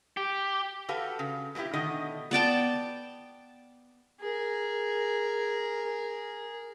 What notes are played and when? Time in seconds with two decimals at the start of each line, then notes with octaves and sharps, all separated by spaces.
0.17 G4
0.89 F#4 G4 A4 B4 F5
1.19 C#3
1.55 B2 G#3 A#3 E4 G4
1.73 B2 D3 D#3 A3 D#5
2.31 B3 D5 G5 A5
4.20 G#4 A#4